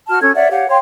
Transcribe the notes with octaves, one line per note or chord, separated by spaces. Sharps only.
F#4 A5 F6
C#4 A4 G#6
C#5 D5 E5 F#5
G4 C#5 F5 F#5
C#5 F5 G5 C6